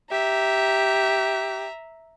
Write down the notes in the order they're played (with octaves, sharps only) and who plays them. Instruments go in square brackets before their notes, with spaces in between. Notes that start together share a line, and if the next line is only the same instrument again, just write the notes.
[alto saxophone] G4 [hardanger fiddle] E5 A#5